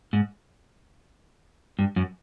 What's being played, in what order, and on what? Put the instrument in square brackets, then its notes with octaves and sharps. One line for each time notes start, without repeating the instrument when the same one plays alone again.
[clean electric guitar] G#2
G2
F#2